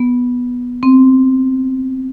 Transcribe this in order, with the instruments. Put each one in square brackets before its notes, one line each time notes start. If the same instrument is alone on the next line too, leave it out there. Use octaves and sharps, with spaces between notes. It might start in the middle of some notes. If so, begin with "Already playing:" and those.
Already playing: [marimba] B3
C4